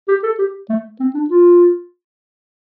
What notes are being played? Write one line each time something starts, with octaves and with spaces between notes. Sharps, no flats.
G4
A4
G4
A3
C4
D4
F4